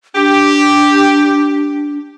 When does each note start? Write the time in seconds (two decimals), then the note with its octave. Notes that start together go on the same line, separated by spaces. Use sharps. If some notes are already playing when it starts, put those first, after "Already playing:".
0.15 D4 G4